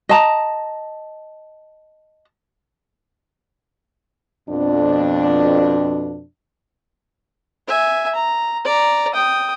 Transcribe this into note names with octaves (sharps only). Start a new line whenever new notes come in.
D#5 A5 A#5
F2 B2 D4
E5 G#5
A#5
D5 A#5
G5 D#6